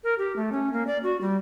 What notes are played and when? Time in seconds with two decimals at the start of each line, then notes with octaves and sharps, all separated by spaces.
0.04 A#4
0.18 G4
0.36 A3
0.52 C#4
0.73 A#3
0.87 D5
1.03 F#4
1.21 G3